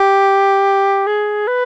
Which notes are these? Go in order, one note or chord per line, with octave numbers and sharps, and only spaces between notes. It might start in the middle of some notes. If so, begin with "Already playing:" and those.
Already playing: G4
G#4
B4